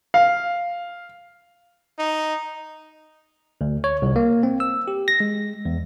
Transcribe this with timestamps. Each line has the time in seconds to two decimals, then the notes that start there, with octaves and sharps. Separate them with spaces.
0.14 F5
1.98 D#4
3.61 D2
3.84 C#5
4.02 C2
4.16 A#3
4.43 C4
4.60 E6
4.88 G4
5.08 A#6
5.20 G#3
5.65 E2